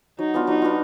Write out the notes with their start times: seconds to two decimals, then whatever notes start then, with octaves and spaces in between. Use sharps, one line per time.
0.19 F#3 D#4
0.34 B3 D4 F4
0.47 F#3 D#4
0.62 B3 D4 F4